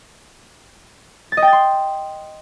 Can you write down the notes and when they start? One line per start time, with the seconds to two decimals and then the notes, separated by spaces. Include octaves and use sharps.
1.32 A6
1.37 D#5
1.42 G5
1.47 A6
1.53 C6